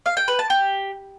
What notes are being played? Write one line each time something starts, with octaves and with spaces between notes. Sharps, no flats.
F5
G5
B4
A5
G4